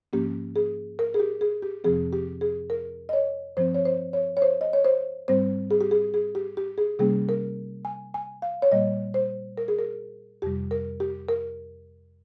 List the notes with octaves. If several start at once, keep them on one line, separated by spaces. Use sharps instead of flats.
G#2 F3 A#3 C#4 G4
G#4
A#4
G#4
G4
G#4
G4
F2 C3 F3 C4 G#4
G4
G#4
A#4
D#5
C#5
G2 F3 C4 C5
C#5
C5
C#5
C#5
C5
D#5
C#5
C5
G#2 G3 C4 C5
G#4
G4
G#4
G#4
G4
G4
G#4
C3 G3 A#3 C#4 G#4
A#4
G#5
G#5
F5
C#5
A#2 G3 A#3 D#5
C5
A#4
G#4
A#4
F2 C3 G3 G4
A#4
G4
A#4